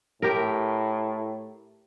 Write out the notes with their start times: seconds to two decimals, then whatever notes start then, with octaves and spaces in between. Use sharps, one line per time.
0.22 A2 G4 A#4